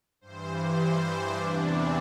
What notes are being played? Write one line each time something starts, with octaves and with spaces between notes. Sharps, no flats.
G2 E3 C5
C5
D4
E2 C3 E3 D4
C4